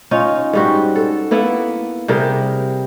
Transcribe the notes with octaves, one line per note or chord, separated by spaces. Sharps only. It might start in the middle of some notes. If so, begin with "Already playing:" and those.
C#4 D#4 F4
G#2 G3 F#4
A4
A#3 B3 E4 A4
C3 G3 G#4 A#4